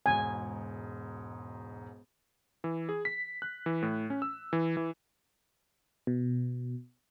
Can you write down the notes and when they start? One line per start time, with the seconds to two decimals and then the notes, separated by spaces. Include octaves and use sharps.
0.06 E1 G#2 F#4 G#5
2.64 E3
2.89 G#4
3.05 B6
3.42 F#6
3.66 E3
3.82 A2
4.10 C#4
4.22 E6
4.53 E3
4.77 E3
6.07 B2